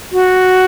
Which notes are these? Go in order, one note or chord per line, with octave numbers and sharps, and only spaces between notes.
F#4